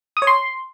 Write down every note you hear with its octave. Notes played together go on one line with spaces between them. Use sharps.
D#6
C#5
C6